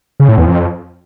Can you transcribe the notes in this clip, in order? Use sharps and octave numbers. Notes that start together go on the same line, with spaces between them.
C#3
A2
E2
F2